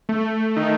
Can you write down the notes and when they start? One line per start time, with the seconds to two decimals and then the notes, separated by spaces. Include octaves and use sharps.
0.09 A3
0.56 D#3